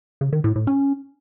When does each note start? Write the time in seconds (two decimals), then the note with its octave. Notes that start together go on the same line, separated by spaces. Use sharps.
0.21 C#3
0.33 D#3
0.44 A2
0.56 A2
0.67 C#4